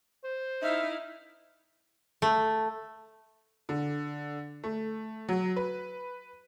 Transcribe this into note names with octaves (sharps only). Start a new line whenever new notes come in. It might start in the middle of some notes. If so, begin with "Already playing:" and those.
C5
D#4 E4 E5 F5
A3
D3
A3
F#3
B4